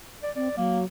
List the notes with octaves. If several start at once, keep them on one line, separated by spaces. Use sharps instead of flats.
D5
C4 D5
F#3 A#3